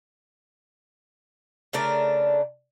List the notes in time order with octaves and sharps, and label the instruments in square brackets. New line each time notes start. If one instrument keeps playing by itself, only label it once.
[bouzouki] C#3 A3 D4 A#4